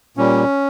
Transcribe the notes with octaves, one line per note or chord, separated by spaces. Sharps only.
A#2 G3 C#4